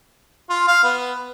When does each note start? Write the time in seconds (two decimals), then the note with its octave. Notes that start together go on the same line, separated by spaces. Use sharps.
0.49 F4
0.68 F5
0.83 B3